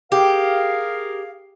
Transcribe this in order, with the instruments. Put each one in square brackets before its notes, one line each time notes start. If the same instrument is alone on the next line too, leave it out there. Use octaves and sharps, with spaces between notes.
[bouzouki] G4 [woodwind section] G#4 A#4 F5